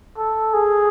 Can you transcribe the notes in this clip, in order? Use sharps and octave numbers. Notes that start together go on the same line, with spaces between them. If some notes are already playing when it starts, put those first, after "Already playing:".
A4
G#4